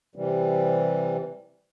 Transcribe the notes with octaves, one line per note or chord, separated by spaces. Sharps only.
C3 E3 G3